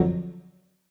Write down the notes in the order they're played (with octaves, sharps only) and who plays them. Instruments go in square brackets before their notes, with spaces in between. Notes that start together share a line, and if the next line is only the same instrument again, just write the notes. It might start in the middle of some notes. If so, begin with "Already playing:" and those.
Already playing: [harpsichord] F2 D3 F#3